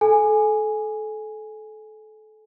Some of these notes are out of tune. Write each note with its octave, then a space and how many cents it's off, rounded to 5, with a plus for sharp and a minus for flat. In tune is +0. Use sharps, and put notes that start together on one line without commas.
A4 -25 G#5 +0